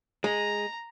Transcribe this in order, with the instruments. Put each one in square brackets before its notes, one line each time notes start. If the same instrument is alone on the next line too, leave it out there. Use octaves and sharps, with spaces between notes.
[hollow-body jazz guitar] G#3 [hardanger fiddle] A#5